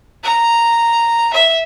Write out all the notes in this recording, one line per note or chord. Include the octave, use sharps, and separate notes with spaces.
A#5
E5